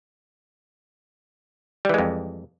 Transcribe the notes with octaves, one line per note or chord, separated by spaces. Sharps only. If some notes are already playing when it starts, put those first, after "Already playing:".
F2 E3 G3 G#3